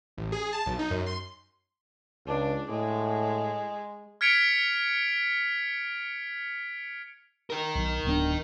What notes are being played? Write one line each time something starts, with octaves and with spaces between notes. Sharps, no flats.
A1
G#4
A5
B1
D#4
F#2
C6
C#2 D4
A2 G#3
F6 G#6 B6 C#7 D7 F7
D#4 A#4
B1
D1 B3 D4